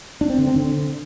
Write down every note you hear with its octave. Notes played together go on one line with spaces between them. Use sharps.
D4
C4
D3
C4
D3